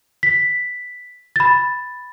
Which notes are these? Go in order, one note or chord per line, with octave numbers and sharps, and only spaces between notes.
B6
B5 A6